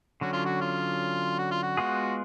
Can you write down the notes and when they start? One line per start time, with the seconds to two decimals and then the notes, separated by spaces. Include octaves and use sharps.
0.21 D3 F#3 C#4 F#4
0.33 F4
0.45 F#4
0.61 F4
1.38 F#4
1.51 F4
1.63 F#4
1.77 G#3 B3 F4 G#4